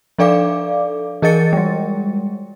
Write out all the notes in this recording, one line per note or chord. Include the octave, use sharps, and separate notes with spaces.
F3 D4 A4 D5 F5 D6
E3 G#4 A#4 D#5 A6 C#7
G3 G#3